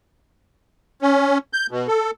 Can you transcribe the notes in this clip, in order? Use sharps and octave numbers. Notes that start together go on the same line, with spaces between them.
C#4
G6
B2
A4